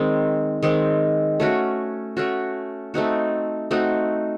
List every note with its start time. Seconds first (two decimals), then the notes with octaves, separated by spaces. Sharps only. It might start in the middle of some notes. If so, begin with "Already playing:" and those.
Already playing: D#3 G#3 C4
0.63 D#3 G#3 C4
1.40 A3 C#4 F#4
2.17 A3 C#4 F#4
2.94 A3 C4 D#4 F#4
3.71 A3 C4 D#4 F#4